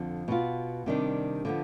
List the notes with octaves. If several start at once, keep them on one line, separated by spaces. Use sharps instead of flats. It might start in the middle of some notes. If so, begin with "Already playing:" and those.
Already playing: F2 D3 F3
B2 B3 F4
C3 D#3 G3 D4
D3 F3 B3